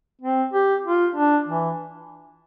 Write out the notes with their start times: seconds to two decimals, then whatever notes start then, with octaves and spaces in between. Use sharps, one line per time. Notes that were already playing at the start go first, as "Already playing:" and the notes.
0.21 C4
0.53 G4
0.85 F4
1.16 D4
1.48 E3